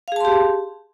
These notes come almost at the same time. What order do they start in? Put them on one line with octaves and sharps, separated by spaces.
F5 G#4 A5 C6 G4